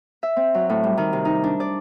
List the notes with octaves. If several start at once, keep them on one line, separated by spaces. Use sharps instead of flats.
E5
C4
F#3
A2
G3
D#3
C3
D#4
D4
D5